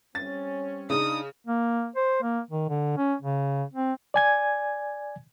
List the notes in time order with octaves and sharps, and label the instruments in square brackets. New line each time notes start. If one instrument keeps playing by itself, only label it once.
[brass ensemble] G3 C4 C#4 [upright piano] A6
[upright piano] C#3 [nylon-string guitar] D4 D#4 [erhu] D#6
[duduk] A#3
C5
A#3
D#3
D3
C#4
C#3
C4
[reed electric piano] D5 G#5 G#6